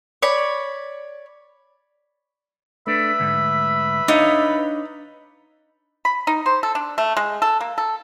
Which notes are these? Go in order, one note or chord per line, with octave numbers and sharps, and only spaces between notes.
C#5 D5 B5
A3 D4 B4 E5 B5
D2 G#2
D4 D#4 C#5 F5
B5
D#4
C5
A4
D4
A3
G#3
A4
A#3
A4